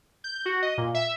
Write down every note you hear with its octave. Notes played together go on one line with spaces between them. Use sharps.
G6
F#4
D#5
A#2
E5